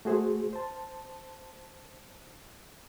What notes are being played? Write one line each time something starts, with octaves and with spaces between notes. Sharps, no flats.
A3 F#4 G#4 C5
C5 A5